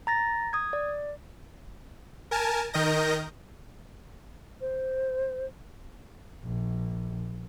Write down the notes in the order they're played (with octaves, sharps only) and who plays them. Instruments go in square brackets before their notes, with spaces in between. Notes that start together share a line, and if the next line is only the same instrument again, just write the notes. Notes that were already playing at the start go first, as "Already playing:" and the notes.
[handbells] A#5 A6 A#6
D#6 G#6
D5
[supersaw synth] A#4 G#5 A5
D#3 A#4 D#5 G6 A#6
[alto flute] C5
[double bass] A#1